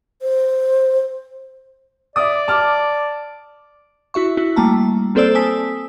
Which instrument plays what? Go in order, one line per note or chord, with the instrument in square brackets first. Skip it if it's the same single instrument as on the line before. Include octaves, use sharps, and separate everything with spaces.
[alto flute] C5
[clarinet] D5 [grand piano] E5 D6 D#6
[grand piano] A5 D6 F6
[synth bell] E4 F#4 E5 C#6
E4 F#4
G3 A3 A#3 A5 A#5
A#3 C4 A4 C5 D5 E6
G#5 A5 D#6 E6 B6